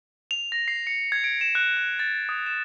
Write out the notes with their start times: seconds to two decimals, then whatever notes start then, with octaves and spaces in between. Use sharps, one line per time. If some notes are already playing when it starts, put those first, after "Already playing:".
0.31 F7
0.52 A#6
0.68 C7
0.87 C#7
1.12 G#6
1.24 D7
1.41 E7
1.55 F#6
1.77 F#6
1.99 A6
2.29 D#6
2.46 E7